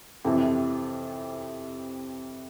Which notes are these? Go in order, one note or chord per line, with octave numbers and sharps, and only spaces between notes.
F2 C3 E3